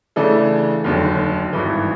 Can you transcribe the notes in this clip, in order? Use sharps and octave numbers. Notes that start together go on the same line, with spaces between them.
C#3 E3 A3 D4
F1 D#2 D3 F#3
G#1 G2 E3